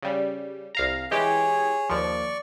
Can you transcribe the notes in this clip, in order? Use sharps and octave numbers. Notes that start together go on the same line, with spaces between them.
C#3 G3
C2 F5 A#5
E3 G#3 G4 G#4 C#5
D#2 F3 D5 C#6